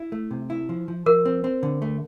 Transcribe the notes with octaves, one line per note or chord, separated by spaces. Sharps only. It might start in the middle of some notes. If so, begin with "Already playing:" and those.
Already playing: E4
A3
C3
E4
F3
F3
F3 A#4
C4
C4
D3
A3